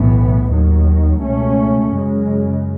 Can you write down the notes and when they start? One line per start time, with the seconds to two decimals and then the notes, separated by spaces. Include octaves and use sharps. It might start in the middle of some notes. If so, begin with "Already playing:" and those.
Already playing: B1 A2 E3 B3
0.50 D#2 D#3 F#3
1.21 C#2 B2 A3 C#4
1.93 F#2 C#3 G#3